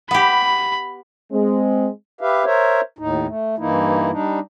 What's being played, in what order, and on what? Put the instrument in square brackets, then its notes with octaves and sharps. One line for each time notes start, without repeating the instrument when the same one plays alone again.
[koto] B3 G4 [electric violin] B5
[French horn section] G#3 C4
[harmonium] G4 B4 E5 F5
A#4 C5 C#5 E5
D#2 A2 D#4
A3
G2 E3 A#3 D#4 E4
G3 D4 D#4